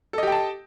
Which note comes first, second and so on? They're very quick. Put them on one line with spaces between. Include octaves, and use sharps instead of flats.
A4 D#5 G4 G5 A5